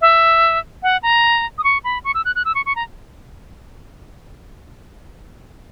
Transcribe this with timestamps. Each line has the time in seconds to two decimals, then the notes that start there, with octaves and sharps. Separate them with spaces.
0.01 E5
0.83 F#5
1.03 A#5
1.58 D#6
1.64 C#6
1.84 B5
2.04 C#6
2.14 E6
2.25 F#6
2.36 F#6
2.45 E6
2.55 C#6
2.66 C#6
2.76 A#5